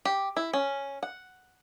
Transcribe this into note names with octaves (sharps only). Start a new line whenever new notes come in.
G4
E4
C#4
F#5